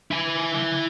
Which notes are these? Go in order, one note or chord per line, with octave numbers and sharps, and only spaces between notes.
E4 G#5